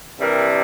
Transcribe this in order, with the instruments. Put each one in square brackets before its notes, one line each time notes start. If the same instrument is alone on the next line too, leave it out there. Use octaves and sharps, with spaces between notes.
[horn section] C3 E3 G3 D4 A#4